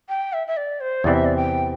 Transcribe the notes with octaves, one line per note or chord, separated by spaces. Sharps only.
G5
E5
E5
D5
C5
E2 C3 E3 C4 E4 D5
E5
D5
G5